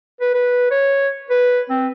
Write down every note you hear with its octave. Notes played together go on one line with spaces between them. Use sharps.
B4
B4
C#5
B4
C4